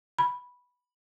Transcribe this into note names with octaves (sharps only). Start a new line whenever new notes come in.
B5